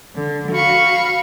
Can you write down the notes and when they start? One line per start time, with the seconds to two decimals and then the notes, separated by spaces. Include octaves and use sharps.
0.16 D3
0.53 F#4 F5 B5 C#6